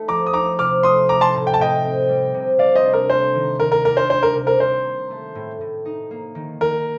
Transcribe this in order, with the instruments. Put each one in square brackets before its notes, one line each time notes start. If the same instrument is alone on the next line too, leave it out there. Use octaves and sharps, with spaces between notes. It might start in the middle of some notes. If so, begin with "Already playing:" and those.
Already playing: [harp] A3 D#4
[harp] F3 [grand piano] A#5 D6
[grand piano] D#6
[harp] D#4 [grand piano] A#5 D6
[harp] C3 [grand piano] D6 F6
[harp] A3 [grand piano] C6 D#6
[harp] A3 [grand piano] A#5 D6
[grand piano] A5 C6
[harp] A2
[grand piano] G5
A5
[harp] A2 [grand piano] D#5 G5
[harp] C4
G3
C3
[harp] C3 [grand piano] D5 F5
[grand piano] C5 D#5
[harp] D4
[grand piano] A#4
[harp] A3 [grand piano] C5
[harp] D#3
[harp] D#3 [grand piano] A#4
[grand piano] A#4
[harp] D4 [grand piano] A#4
[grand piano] C5
[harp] G3 [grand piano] C5
[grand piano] A#4
[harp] C3
[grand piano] A#4
[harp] C3 [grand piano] C5
[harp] A#3
A3
A2
A2
D#4
A#3
D#3
[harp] D#3 [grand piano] A#4